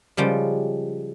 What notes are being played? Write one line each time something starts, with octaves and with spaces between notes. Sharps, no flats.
C#3 F3 G3 G#3